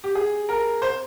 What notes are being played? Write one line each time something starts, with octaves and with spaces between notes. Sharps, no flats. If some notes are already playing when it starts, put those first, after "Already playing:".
G4
G#4
A#4
C5